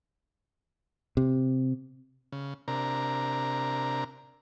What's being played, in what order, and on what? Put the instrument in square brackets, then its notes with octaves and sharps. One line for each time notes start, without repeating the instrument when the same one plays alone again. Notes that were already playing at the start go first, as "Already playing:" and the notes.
[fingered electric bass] C3
[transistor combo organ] C#3
C3 D4 A#4 A#5